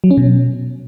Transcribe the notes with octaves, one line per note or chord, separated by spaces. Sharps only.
F#3
C#4
B2